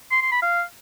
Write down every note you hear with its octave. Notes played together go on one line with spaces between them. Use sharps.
C6
C6
B5
F5